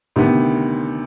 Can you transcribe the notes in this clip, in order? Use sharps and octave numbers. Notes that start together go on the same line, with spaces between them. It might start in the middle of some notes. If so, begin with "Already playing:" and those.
D2 C3 D#3 B3